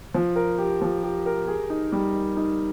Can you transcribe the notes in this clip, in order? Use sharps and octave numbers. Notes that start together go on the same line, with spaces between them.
F3
A#4
G4
F3
G4
A#4
G#4
D#4
G3
D#4
D#4